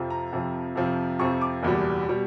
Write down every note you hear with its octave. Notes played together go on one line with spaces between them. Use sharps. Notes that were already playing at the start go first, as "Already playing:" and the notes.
Already playing: F2 C3 F3
A#5
F2 C3 F3
F2 C3 F3
F2 C3 F3 C#6
D6
F#1 E2 B2 G3
B2 G3